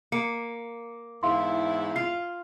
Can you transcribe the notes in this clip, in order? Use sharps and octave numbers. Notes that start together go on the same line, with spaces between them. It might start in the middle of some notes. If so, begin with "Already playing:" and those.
A#3 C#7
E2 G#2 E4 F5 C6
F4 C7